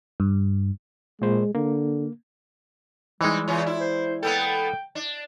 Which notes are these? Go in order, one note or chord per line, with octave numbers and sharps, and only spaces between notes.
G2
A#2 G#3 C5
D3 A#3
E3 G3 G#3 C4 D#4
E2 C#3 C#4 F4
E4 F4
C5
A#3 B3 A4 G5
D4